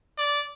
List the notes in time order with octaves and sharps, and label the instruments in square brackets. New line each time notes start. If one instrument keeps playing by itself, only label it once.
[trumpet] D5